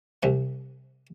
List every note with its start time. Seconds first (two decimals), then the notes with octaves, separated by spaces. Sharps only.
0.23 C2 C3 F#5